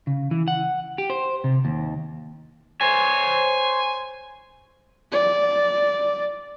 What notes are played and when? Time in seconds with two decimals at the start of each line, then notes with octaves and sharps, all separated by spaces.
0.07 C#3
0.31 E3
0.48 F#5
0.98 G4
1.10 C5
1.44 C3
1.65 D#2
2.81 C5 C#5 G#5
5.12 D5